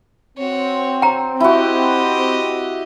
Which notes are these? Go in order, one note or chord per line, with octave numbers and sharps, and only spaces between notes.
C4 F#4 C#5
G5 A#5
E4 F#4 G4 D#5